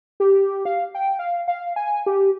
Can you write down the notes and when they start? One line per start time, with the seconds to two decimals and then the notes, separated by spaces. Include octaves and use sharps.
0.20 G4
0.65 F5
0.95 G5
1.19 F5
1.48 F5
1.76 G#5
2.06 G4